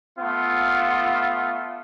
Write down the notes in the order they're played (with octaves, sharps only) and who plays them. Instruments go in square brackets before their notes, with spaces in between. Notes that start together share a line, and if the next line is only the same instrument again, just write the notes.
[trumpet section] A3 B3 F4